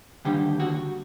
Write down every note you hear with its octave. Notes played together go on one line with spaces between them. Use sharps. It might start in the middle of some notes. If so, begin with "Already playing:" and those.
D#2 D3 G3 G4
F#4